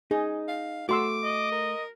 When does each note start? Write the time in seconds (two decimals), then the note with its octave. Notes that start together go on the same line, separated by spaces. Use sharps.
0.11 D#4 G#4
0.48 F5
0.89 A3 F#4 C6 D6 E6
1.23 D#5
1.52 A#4